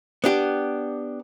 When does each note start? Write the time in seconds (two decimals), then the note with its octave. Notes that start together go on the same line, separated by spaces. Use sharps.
0.24 B3 D4 G4